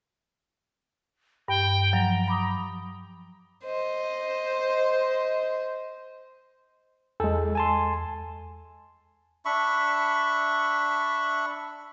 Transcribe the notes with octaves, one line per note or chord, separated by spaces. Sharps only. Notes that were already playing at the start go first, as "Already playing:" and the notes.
G2 G5
F3 F#3 A#5
B5 D6 D#6
C5 D#5
E2 G#3 A4
G#5 A5 C6
D4 E5 B5 C#6